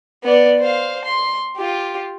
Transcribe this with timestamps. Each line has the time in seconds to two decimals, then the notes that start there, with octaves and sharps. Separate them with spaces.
0.23 B3 D5
0.60 C5 F5
1.05 C6
1.57 F4 G4